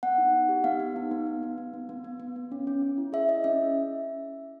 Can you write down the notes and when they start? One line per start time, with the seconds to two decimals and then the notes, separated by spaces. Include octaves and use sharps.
0.03 B3 F#5
0.18 D#4
0.33 D#4
0.49 G4
0.64 B3 F5
0.80 B3
0.96 D#4
1.11 B3
1.27 B3
1.43 B3
1.58 B3
1.74 B3
1.89 B3
2.04 B3
2.20 B3
2.36 B3
2.52 C#4
2.67 C#4
2.82 C#4
2.98 E4
3.13 G#4 E5
3.29 E4 D#5
3.44 C#4 E5